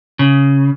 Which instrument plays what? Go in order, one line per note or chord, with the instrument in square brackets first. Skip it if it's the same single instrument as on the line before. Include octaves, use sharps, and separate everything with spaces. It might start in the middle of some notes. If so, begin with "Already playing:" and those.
[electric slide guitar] C#3